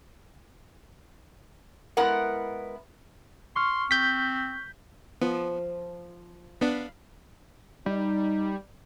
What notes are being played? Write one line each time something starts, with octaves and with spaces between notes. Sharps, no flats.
G#3 B3 E4 A#4 F#5
C6 C#6 F6
C4 G6 B6
F3 B3
B3 D4 F5 B5
G3 D#4